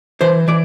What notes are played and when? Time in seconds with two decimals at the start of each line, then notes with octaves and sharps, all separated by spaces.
0.21 E3 C5
0.48 E3 D5